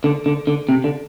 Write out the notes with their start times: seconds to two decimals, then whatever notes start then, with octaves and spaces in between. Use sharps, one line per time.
0.04 D3
0.26 D3
0.47 D3
0.69 C3
0.84 D3